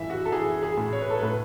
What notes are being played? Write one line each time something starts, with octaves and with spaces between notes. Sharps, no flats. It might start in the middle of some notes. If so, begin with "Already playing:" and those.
Already playing: A2 E3 E5
F#4
A4
E3 G#4
G#4
A2
C#5
B4
A4
A2 B4